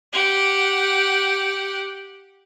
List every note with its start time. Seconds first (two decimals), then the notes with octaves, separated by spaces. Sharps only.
0.13 G4 F#5